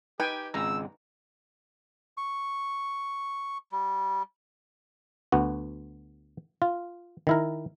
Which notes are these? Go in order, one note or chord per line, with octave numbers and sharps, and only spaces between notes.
D#4 G4 B4 G5 G#5
G#1 C#2 G#3 A#5 E6
C#6
G3
D2 B3 F#4
F4
D#3 E4 A#4